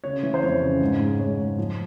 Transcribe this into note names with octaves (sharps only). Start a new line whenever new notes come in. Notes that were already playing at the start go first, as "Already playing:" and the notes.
C#3 C#5
E3
C5
F2 C#5
C#3
G#2
G#2
G#2 C#5
G#2
F3